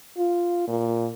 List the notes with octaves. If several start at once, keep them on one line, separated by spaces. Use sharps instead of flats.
F4
A#2